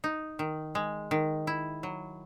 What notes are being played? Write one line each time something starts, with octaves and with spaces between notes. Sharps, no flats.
D#4
D#3
G#3
D#3
E4
F#3